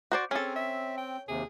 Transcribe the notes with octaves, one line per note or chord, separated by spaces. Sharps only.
F#4 C5 D5
C4 C#4 G#4 A4
E5
G5
D#2 C3 G#4